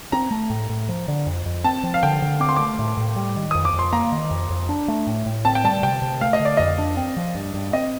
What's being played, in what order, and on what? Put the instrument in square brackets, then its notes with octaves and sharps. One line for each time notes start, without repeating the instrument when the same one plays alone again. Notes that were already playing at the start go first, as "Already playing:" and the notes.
[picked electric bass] C4 [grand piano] A#5
[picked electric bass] A3
A2
A2
F3
D3
F2
F2
[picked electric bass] C4 [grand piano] A5
[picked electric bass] F3
[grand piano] F5
[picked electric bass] D3 [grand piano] G5
[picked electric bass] D3
[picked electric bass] C4 [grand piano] D6
[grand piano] C6
[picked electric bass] A3 [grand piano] D6
[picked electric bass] A2
A2
G3
D#3
[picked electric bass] F2 [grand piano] D#6
[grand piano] D6
[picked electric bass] F2
[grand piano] C6
[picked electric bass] A#3 [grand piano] A#5
[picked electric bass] D#3
F2
F2
D4
A3
A2
A2
[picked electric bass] C4 [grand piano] A5
[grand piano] G5
[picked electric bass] G3 [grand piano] A5
[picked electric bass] C3 [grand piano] G5
[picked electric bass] C3
[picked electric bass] A3 [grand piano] F5
[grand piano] D#5
[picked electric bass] D3
[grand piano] D5
[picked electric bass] F2 [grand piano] D#5
[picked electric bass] D4
C4
F3
G2
G2
[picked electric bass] C4 [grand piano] D#5